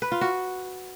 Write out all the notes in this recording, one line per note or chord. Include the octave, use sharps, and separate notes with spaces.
B4
F4
F#4